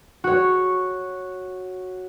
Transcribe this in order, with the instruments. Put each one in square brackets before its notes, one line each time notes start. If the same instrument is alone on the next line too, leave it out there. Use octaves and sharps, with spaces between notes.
[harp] F#4 C#5